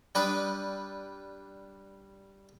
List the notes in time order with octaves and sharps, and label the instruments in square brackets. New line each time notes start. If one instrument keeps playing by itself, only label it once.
[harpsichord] G3 D4 B4 D#6